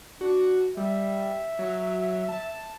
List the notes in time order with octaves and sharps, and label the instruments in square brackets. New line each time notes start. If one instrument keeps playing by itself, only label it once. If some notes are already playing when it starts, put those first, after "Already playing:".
[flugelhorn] D4 [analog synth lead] F#4
[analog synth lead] G3 [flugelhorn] E5
[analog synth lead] F#3
A5